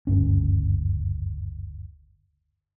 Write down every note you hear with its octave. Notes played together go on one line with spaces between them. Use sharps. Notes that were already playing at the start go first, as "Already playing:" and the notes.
F#1 D2 G2 C#4